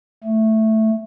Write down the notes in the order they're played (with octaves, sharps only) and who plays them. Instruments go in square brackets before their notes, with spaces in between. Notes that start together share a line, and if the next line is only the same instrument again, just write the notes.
[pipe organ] A3